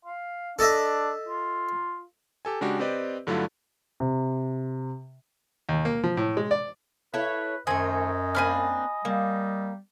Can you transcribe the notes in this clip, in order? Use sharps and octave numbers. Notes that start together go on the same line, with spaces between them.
F5
D4 A4 D#5 E5
F4
G4 A4 G#5
C#3 G#3 D4 F#4 G4
C4 G4 B4 D5 D#5
G2 D3 F#3 A3 E4 F4
C3
D#2
A#3
F3
A2
G#3
D5
E4 A4 B4 C#5
F#2 D#3 A3 C4 D#5 G#5
A#3 C4 D4 G#5 B5 F6
G3 A#3